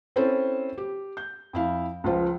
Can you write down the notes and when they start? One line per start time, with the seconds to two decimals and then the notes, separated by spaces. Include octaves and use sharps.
0.16 C4 C#4 E4 A4 C5
0.78 G4
1.17 G6
1.53 F2 E4 F5
2.04 C#2 F3 F4 C5